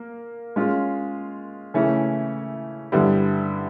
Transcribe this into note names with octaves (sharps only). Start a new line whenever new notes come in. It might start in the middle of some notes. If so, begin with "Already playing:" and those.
Already playing: A#3
G#3 C#4 F4
C#3 E3 A3 C#4 E4
G2 D3 G3 B3 E4